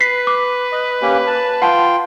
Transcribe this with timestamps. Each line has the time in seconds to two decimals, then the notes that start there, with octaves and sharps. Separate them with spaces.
0.01 B4 B6 C7
0.27 D6
0.72 D#5
1.02 A#3 C#4 G4
1.27 A5
1.62 F4 F#5 G5 A5 C6